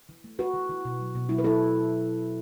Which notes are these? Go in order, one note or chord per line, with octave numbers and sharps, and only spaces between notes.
E3
A3
E3 F#4 B4
E3
E3
B2
F#3
B2
F#3 E4
B4
F#3 E4 A4